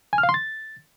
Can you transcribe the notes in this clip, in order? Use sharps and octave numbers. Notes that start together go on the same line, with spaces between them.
G#5
F6
F5
C6
A6